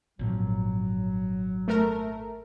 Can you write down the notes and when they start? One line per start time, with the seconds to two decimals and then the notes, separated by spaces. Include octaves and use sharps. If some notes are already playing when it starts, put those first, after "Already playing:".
0.19 G#1 A#2 F3 F#3
1.68 A3 A#4